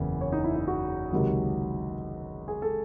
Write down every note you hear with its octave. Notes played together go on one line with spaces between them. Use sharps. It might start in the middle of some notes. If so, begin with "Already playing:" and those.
Already playing: F#1 E2 C#3 E3
C#5
D#4
E4
E4
F#4
C#2 C3 D#3 F#3
G#4
A4